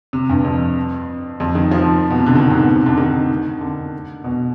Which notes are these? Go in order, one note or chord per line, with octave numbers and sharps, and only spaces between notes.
C3
G2
F2
F2
D#3
F3
B2
C3
D3
D#3
G#2
B2
C3
D3
D#3
D3
B2